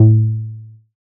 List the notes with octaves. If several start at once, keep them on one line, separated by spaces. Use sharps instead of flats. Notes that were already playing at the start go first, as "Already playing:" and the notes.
Already playing: A2